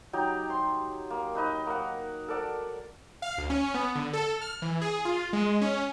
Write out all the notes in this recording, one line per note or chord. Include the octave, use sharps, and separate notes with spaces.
F#3 D#4 G4
C6
A#3
D#4 B4 D#5
A#3 F#5
A4 A#4 D5 F#5
F5
D2
C#4
B3
D3
A4
F6
E3
G#4
F4
G#3
C#4